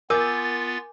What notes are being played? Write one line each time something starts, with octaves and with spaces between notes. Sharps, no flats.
B3 F4 A#4 G#5 D6 G6 A6